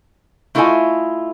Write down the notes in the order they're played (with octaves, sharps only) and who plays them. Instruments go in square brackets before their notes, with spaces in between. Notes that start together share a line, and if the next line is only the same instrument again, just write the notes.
[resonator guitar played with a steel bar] A3 E4 F4 A4 D#5 G#5